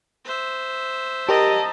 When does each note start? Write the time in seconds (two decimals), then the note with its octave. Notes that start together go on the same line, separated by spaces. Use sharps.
0.25 C5 E5
1.29 G4 A#4 D#5 A5 A#5